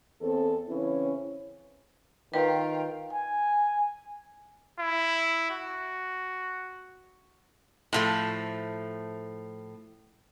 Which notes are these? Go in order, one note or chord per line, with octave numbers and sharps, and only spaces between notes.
E2 C4 A4
C#3 E3 C4 C#4 E4 C#5
D#3 F4 B4 G5
G#5
E4
F#4
A2 F3 A3